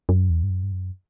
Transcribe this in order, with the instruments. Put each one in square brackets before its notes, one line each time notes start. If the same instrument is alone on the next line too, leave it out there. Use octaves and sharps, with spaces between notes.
[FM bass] F#2
E2
G2
F#2
G2
F#2